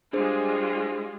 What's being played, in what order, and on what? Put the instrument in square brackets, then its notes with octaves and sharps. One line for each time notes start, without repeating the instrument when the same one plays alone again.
[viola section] G3 G#3 F4 [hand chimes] D4 G#4 C5